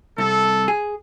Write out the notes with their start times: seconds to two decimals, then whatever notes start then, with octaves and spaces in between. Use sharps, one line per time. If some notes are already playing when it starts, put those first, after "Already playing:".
0.18 C2 A4
0.68 G#4